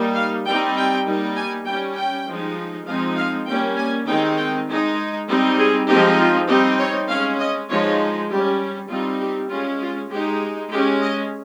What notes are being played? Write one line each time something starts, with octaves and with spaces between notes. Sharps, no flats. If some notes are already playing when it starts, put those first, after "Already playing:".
Already playing: G3 A#3 D#4
F5
G3 C4 D#4 G5
G5
G3 A#3 D#4
G#5
G3 C#4 G5
G5
F3 G#3 D#4
F3 G#3 C4 D#4 F5
F5
G3 A#3 C#4 G5
G#5
D#3 G#3 C4 D#4 G5
G5
G#3 D#4
G3 C4 D#4
G#4
F3 G#3 C4 D#4 G4
F4
G3 C4 D#4 G4
C#5
G#3 C#4 F5
D#5
F3 G#3 D#4 C#5
G3 C#4 G4
G3 C4 D#4 F4
G4
G#3 C#4 F4
F4
G#3 D#4 G4
G#3 C#4 G4
D#5